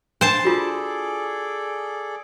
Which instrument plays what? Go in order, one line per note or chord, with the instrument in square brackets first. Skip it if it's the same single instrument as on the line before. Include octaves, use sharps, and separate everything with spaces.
[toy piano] D4 [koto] C5 A5
[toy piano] F4 F#4 [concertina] G#4 A4 D5